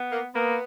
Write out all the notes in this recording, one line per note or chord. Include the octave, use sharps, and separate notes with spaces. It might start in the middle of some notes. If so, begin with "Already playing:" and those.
Already playing: B3
A#3
A#3 B3